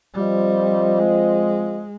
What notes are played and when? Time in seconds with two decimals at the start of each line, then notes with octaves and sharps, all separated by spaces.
0.14 F3 G3 C4 F4 C5 D#5
0.99 G#3